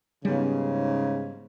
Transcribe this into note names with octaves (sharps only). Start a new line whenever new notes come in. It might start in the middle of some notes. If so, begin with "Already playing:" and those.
G#2 C#3 G3 B3